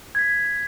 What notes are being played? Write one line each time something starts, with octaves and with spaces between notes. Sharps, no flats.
G#6 B6